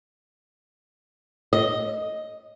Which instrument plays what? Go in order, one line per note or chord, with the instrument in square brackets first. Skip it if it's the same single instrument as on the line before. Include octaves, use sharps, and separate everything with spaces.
[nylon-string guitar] D#5